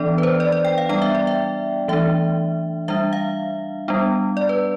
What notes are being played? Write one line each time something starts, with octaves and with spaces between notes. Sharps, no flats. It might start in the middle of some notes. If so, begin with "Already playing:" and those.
Already playing: E3 B3 D4 D5
B4
C5
D5
D5
G5
F5
G3 B3 D4 G5
E5
D5
E5
E3 A3 D4 E5
G3 D4 E5
F5
G3 B3 D4
D5
B4